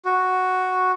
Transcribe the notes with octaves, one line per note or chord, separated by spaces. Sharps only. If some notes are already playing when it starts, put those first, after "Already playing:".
F#4